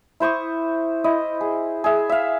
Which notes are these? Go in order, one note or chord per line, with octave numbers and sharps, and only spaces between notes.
E4 C5 C#6 D#6
E4 D#5
G#4
G#4 E5
E5 F5